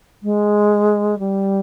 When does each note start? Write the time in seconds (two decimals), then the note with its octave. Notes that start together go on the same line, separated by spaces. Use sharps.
0.22 G#3
1.18 G3